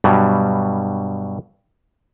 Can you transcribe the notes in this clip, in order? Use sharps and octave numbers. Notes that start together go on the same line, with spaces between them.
G2 B2 F#3 G3